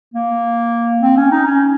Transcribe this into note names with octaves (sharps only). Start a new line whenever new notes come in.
A#3
C4
C#4
D#4
C#4